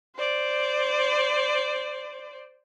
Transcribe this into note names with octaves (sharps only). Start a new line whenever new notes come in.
C5 D5